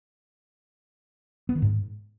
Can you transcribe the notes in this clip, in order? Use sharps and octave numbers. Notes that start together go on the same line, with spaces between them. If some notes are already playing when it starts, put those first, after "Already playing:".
B3
D#3
G#2